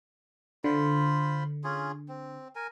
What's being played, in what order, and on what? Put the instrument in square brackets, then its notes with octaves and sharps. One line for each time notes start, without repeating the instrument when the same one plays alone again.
[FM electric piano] D3 [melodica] F4 C5 B5
[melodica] C#4 F4 G#4
C4
A#4 G#5